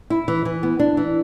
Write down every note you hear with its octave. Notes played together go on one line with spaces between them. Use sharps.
E4
E3
E3
B3
D4
E3